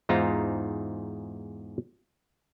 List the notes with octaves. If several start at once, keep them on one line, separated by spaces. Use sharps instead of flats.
E2 G#2 D#4 F4 C5 A#5